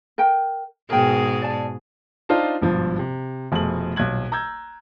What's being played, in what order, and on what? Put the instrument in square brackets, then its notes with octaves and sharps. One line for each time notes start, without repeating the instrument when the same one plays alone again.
[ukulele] A#4 G5
[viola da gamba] G#2 B2 G#4 [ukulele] A#4 G5
[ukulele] D5 A5
[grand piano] D4 D#4 F4 C5 F5 A5
G#1 G2 B2 F3
C3
F1 F2 B2 A3 G#4 F#7
D#1 B1 F#6 G#6 F#7
A#5 E6 G6 G#6